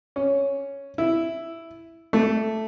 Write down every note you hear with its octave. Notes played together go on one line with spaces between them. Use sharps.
C#4
E4
A3